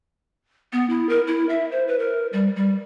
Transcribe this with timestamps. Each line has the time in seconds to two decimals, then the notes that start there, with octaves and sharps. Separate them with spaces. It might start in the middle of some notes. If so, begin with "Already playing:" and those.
0.73 B3
0.90 E4
1.09 A#4
1.27 E4
1.49 E5
1.72 C5
1.88 B4
1.99 A#4
2.33 G3
2.56 G3